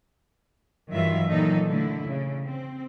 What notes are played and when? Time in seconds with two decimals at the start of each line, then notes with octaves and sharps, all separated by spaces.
0.92 G2 D#3 E3 F#3 F4 E5
1.29 A#2 D#3 E3 F#3 D#4 A4
1.68 D3 A3 E4
2.09 C#3
2.46 C4